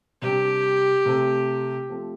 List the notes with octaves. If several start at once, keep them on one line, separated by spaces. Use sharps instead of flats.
C3 G3 D4 G4
C3 A3 C4
F3 A3 C4